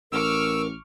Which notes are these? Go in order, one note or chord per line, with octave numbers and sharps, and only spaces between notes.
A1 A#4 C#6 D6 E6 F6